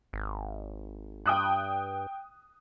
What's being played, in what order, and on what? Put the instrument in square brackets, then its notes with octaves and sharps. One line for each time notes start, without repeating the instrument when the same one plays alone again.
[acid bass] G#1
[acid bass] G2 [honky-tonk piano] G5 D#6 F#6